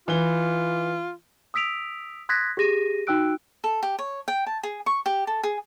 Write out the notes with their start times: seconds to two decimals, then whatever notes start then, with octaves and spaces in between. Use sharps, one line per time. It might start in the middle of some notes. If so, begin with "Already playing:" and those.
0.08 E3 F4 G7
1.54 D#6 E6 B6 D7 F7
2.29 C6 D#6 F#6 G#6 A#6 B6
2.57 G4 G#4 A#6 D#7
3.07 D#4 F#4 G5 E6 F#6 D7
3.64 A4
3.83 G4
3.99 C#5
4.28 G5
4.46 A5
4.63 G#4
4.86 C#6
5.06 G4
5.27 A4
5.43 G#4